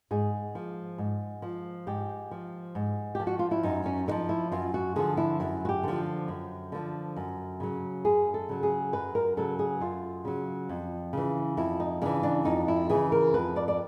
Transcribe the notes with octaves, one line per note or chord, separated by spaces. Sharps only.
G#2 G#4
F3
G#2
F3
G#2 G4
F3
G#2
F3 G4
F#4
F4
E4
F#2 D#4
C#4
D3 F3 D#4
E4
F#2 F4
F#4
D3 F3 G#4
E4
F#2 E4
F#4
G4
D3 F3
F#2
D3 F3
F#2
C#3 F#3
F#2 G#4
A4
C#3 F#3
G#4
F#2 B4
A#4
C#3 F#3 A4
G#4
F#2 F4
C#3 F#3
F2
C#3 E3
F2 E4
D#4
C#3 E3 D4
D4
F2 D#4
E4
C#3 E3 G#4
A#4
F2 B4
D5
D5